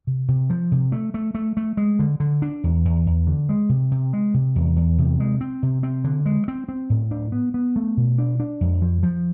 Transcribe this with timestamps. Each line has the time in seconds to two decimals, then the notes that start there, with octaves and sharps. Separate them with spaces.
0.07 C3
0.28 C3
0.50 F3
0.72 C3
0.92 A3
1.14 A3
1.35 A3
1.57 A3
1.77 G#3
1.99 D3
2.20 D3
2.42 D4
2.64 E2
2.85 E2
3.06 E2
3.27 D3
3.49 G#3
3.69 C3
3.91 C3
4.13 G#3
4.34 C3
4.56 E2
4.76 E2
4.98 C3
5.20 G#3
5.41 C4
5.63 C3
5.83 C4
6.04 D3
6.26 G#3
6.48 C4
6.69 C4
6.90 A2
7.11 D4
7.32 B3
7.54 B3
7.76 A3
7.97 B2
8.18 D4
8.40 D4
8.61 F2
8.82 F3
9.03 F3